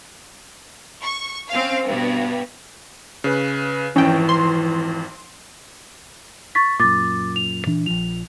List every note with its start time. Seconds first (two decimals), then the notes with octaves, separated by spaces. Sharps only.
1.02 C#6
1.49 C4 C#4 F5
1.84 G2 B2
3.24 C#3 B4 F#6
3.96 G#1 F2 E3 C#4 G5 C#6
4.29 C6
6.55 C#6 A6 B6
6.80 F#2 A#2 D6 A6
7.36 F7
7.66 A#2 E3 D4
7.86 A#1 F3 F7